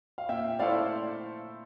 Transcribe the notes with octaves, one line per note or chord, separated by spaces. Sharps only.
F5
A#2 E5 G5
A3 E4 A4 C5 D5 F5